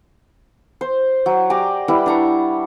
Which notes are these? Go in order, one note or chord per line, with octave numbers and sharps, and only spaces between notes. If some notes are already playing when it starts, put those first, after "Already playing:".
C5
F#3
G4 D5 G#5 A#5
G3 E4 B4 F#5
D4 A#5 C#6